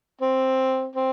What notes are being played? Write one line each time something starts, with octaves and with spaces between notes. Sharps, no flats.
C4
C4